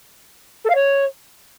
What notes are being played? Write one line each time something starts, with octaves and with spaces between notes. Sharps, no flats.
A4
F5
C#5